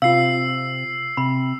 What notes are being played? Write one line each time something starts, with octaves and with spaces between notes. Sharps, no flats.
C3 C4 F4 F5 E6 C7
C3 B5